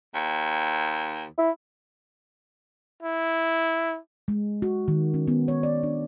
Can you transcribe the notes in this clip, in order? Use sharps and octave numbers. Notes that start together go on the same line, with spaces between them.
D#2
E4
E4
G#3
F#4
D#3
C#4
B3
C#5
D5
D4